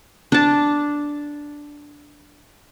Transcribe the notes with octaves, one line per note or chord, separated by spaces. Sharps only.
D4 A5